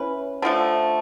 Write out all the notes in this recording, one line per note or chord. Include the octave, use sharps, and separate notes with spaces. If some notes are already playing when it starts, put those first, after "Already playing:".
Already playing: C#4 E4 B4
D3 F3 A3